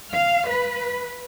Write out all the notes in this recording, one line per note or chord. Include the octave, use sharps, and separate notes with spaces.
F5
B4